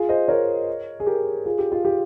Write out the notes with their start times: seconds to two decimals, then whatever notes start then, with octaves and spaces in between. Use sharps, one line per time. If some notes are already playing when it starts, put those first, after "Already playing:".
Already playing: F4 G#4
0.09 C5 D#5
0.28 A#4 C#5
1.00 G#4
1.07 G4 A#4
1.46 F4 G#4
1.59 G4
1.72 F4
1.85 G4